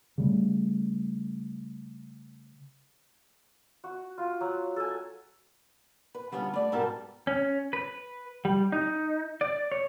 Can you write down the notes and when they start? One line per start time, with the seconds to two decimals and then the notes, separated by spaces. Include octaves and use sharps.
0.18 C#3 G3 A3
3.84 F#4
4.18 F4
4.41 F#3
4.76 A4 G#5
6.15 B4
6.32 D3 G3 B3 C#4 F4
6.53 A3 D5
6.72 G#2 B2 G3 A4 A#4 A5
7.27 C#4
7.73 B4
8.45 G3
8.72 D#4
9.41 D5
9.72 C#5